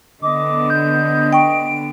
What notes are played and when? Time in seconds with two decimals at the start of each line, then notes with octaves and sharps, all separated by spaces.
0.22 D3 B3 D#5 D6
0.70 G6
1.33 G5 C#6 D7